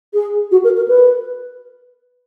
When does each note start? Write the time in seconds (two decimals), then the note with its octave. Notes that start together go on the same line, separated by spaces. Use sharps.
0.14 G#4
0.52 F#4
0.64 A#4
0.76 A#4
0.88 B4